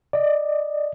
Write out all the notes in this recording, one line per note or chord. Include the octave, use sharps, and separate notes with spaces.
D5 D#5